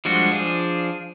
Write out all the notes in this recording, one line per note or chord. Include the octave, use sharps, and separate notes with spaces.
F3 G3 G#3 D4 F#4
F3 D4 G#4